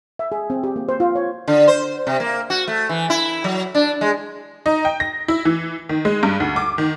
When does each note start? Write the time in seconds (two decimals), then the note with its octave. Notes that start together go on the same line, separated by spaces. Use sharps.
0.19 E5
0.32 G#4
0.50 C4
0.64 G4
0.76 A#3
0.89 C5
1.00 F4
1.15 C#5
1.48 D3
1.68 C5
2.07 C3
2.20 A#3
2.50 F#4
2.68 A3
2.89 E3
3.10 E4
3.44 F#3
3.75 D4
4.01 G#3
4.66 D#4
4.85 G5
5.00 A#6
5.28 E4
5.45 E3
5.89 D#3
6.05 G#3
6.23 G2
6.40 D2
6.56 D6
6.78 D#3